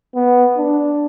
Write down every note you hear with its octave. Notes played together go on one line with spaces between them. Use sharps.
B3
D4